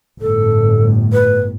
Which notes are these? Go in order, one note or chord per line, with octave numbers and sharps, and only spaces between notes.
G1 A2 A4
B4